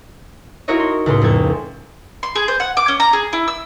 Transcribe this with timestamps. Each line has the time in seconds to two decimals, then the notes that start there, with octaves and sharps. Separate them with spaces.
0.68 D#4 E4 F#4 A#4 C#5 D#5
0.79 C6
1.06 C#2 A2 C6
1.22 F2 A#3 A4 G#6
2.23 C6
2.35 G#4
2.48 C5
2.60 F#5
2.77 D6
2.88 C#4
3.00 A#5
3.13 G#4
3.33 E4
3.48 E6